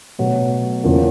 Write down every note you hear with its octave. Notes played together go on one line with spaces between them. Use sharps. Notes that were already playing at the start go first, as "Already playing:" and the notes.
B2 F#3 A3
E2 C#3 F3 A#3